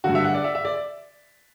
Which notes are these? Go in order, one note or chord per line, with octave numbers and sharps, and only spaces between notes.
G2 D3 F#4
E5
F#5
D5
E5
E5
D5